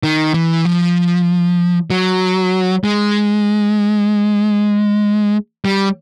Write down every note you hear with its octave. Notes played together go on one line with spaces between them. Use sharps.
D#3
E3
F3
F#3
G#3
G3